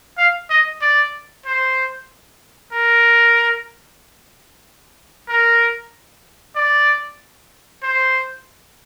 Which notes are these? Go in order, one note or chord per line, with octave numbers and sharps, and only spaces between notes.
F5
D#5
D5
C5
A#4
A#4
D5
C5